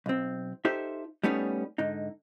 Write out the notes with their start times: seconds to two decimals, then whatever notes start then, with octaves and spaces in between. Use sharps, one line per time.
0.06 B1 C4
0.65 D#4 F4 G4 A4 C5 E5
1.23 G3 A3 B3 C#4 D#4
1.78 G#2 D3 D#4